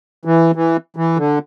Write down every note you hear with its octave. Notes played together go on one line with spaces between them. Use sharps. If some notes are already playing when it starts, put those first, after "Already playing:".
E3
E3
E3
D3